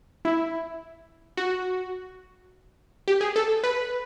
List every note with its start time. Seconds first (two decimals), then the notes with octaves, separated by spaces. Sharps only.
0.25 E4
1.37 F#4
3.08 G4
3.21 G#4
3.36 A4
3.64 B4